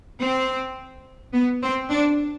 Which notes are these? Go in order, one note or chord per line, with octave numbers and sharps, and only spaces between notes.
C4
B3
C4
D4